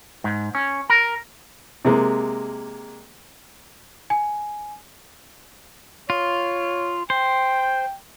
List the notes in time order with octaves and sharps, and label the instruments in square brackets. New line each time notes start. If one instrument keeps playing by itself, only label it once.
[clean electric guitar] G#2
C#4
A#4
[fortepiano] C3 G#3 A#3
[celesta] G#5
[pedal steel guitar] F4 [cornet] C#5
[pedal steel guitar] C5 [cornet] G5